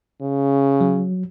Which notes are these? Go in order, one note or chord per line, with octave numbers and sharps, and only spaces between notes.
C#3
F#3